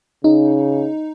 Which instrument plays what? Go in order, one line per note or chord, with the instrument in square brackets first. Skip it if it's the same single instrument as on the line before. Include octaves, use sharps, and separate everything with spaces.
[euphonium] C#3 [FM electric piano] D#4